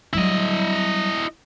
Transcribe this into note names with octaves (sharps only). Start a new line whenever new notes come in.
F#3 G3 E4 D#5